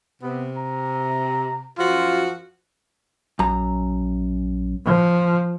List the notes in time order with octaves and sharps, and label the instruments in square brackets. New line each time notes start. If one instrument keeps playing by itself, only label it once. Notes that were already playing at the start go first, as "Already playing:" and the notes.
[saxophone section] C3 [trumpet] B3
[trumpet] A#5
[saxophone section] F#2 F3 F#4 [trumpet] F4
[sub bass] A#1 [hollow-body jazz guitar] F#2 A#5
[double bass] F3